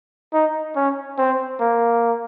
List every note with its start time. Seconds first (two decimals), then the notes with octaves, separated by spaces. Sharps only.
0.33 D#4
0.76 C#4
1.18 C4
1.60 A#3